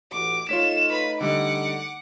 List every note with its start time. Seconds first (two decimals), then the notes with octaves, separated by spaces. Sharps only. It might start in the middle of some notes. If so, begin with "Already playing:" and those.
0.11 A1 F#4 D6
0.49 A3 D#4 F4 C#5 B6 E7
0.89 B4 B5
1.21 D3 G3 D#5 F#5 D6